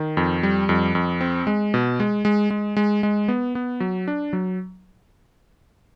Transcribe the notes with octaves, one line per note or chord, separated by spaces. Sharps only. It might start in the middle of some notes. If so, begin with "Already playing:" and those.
Already playing: D#3
F2
G3
F2
F2
C4
G#3
B2
G#3
G#3
G#3
G#3
G#3
B3
B3
F#3
D4
F#3